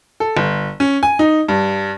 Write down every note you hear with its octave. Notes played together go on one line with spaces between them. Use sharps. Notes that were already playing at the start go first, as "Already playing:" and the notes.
A4
G1
C#4
G#5
D#4
G2